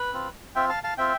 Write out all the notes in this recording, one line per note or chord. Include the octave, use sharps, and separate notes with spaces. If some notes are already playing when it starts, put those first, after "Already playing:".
Already playing: B4
C4 F4
C4 F4 E5 G5
F5 A5
F5 A5
C4 F4 E5 G5